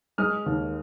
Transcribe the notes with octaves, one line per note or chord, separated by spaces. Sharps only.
G#3 D#6 F6
D#2